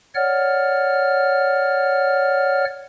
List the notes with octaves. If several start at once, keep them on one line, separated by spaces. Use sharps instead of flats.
C#5 D5 F#5 F6